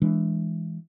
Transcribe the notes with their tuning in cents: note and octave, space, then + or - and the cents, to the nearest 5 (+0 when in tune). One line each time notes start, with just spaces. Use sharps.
E3 +0 G#3 +0 D4 +0